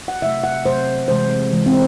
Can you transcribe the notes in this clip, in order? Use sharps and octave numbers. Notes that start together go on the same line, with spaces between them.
F#5
C3 F#3 A3 E5
F#5
C3 F#3 A3 C5
C3 E3 G#3 C5
C3 E3 G#3
C4